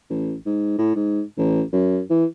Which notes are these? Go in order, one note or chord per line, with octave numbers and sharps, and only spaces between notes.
A1
G#2
A2
G#2
A1
F#2
E3